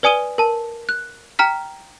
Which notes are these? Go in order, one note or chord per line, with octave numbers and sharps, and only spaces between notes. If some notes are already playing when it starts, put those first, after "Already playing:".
B4 D5 G#5 D#6 D#7 G7
A#4 A5
F#6
G5 A#5 F6 B6